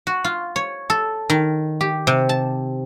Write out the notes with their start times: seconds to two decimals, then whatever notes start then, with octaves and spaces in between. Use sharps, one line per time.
0.07 F#4
0.24 F4
0.56 C#5
0.90 A4
1.30 D#3
1.81 G4
2.07 C3
2.29 A5